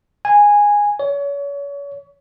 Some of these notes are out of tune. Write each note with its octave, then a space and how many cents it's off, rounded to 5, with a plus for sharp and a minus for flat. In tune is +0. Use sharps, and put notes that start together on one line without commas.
G#5 -10
C#5 +35